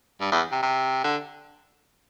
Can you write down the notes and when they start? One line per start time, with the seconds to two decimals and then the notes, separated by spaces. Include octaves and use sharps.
0.21 G2
0.32 E2
0.52 C3
0.63 C3
1.04 D3